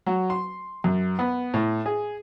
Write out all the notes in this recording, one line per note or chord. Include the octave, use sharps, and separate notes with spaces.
F#3
C6
F#2
B3
A2
G#4